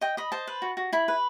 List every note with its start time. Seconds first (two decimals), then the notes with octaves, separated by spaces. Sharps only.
0.01 D#5 G5
0.17 D#5 B5
0.32 C5 A5
0.47 B4
0.62 F#4
0.77 F#4
0.93 E4 B5
1.08 B4